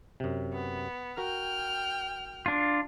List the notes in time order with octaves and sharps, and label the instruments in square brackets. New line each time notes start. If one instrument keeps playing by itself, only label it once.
[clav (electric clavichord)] F#2 C3
[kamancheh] B3
[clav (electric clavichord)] F#4 A#4 [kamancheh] G5 F6
[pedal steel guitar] D4 F4